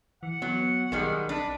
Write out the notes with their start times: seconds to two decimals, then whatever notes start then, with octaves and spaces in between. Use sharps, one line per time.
0.23 E3 F#5
0.42 F#3 B3
0.92 B1 D#3 G3 G#3
1.29 D4 B4